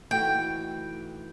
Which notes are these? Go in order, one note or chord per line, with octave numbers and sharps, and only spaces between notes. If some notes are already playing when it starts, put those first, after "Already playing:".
E3 A3 D#4 F#4 G5